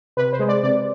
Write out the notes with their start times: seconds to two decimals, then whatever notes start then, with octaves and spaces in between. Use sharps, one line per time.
0.17 C3 B4
0.33 C5
0.39 G#3
0.48 D5
0.63 C3 D5